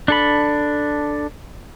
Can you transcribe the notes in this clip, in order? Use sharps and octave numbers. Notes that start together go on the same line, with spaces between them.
D4 A4 B5